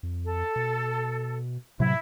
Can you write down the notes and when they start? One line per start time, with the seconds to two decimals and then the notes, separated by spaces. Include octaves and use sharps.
0.03 F2
0.26 A4
0.56 B2
1.80 A2 C3 F#3 E4